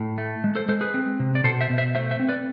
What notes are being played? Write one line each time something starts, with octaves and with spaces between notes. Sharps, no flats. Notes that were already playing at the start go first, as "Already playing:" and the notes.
Already playing: A2
A3
G#3
A4 C5
G#3 A4 C5
G#4 B4
C4
C3
D5
B2 A4 C5
C5 E5
B2
C5 E5
A3 C5 E5
C5 E5
C4
B4 D5